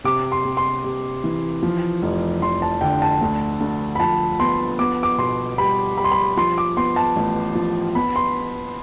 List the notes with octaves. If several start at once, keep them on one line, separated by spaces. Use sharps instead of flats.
C3 D6
C6
C3
C6
C3
E3
F3
F1
F1 C6
A5
D3 G5
A5
D2
D2
B5
F3 A5
B3 C6
B3 D6
D6
B2 C6
G3 B5
G3 B5
C6
B5
F3 C6
D6
B3 C6
A5
A1
F3
B3 B5
C6